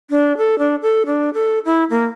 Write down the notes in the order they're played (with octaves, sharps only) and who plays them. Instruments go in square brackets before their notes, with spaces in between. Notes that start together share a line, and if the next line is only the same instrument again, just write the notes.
[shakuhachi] D4
A4
D4
A4
D4
A4
E4
A#3